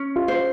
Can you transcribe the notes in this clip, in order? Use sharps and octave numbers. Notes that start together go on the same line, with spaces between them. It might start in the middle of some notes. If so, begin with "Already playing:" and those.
Already playing: C#4
F4
C5